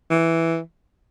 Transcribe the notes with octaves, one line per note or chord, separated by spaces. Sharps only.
E3